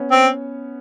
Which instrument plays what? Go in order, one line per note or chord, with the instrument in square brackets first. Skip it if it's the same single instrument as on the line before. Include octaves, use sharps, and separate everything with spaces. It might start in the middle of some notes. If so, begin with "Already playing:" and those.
Already playing: [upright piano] B3 C#4
[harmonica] C4